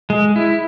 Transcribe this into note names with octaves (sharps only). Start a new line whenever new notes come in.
G#3
E4